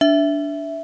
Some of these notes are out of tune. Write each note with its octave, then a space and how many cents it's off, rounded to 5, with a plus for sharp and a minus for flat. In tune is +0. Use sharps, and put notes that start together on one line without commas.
D4 -10 E5 +0